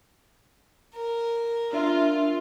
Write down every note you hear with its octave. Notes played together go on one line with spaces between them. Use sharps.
A#4
D4 F4 E5